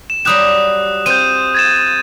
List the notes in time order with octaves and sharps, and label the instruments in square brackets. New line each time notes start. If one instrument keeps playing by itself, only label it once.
[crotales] E7
[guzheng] F#3 G3 G4 [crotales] D#6 F#6 E7
[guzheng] C4 F4 [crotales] G6 D#7
[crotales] G#6 A6 E7